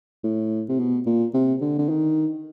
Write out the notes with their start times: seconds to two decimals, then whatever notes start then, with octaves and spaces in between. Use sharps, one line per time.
0.24 A2
0.69 C3
0.79 B2
1.06 A#2
1.34 C3
1.61 D3
1.78 D3
1.89 D#3